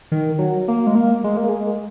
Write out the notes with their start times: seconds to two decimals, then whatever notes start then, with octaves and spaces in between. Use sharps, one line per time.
0.12 D#3
0.39 F#3
0.68 A#3
0.87 G#3
0.95 A#3
1.24 G#3
1.37 A#3
1.49 G#3